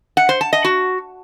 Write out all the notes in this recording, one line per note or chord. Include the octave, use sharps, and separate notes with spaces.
F#5
C5
A5
D#5
F#4